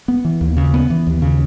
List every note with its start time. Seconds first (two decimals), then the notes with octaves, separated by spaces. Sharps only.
0.08 B3
0.25 E3
0.41 D#2
0.57 C#3
0.74 B3
0.90 E3
1.07 D#2
1.22 C#3